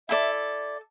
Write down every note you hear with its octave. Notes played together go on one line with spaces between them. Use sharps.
E4 A4 D5 E5